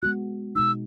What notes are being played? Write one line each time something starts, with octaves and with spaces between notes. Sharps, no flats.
G#3 B3 F#4 F#6
B2 G#3 D#4 E6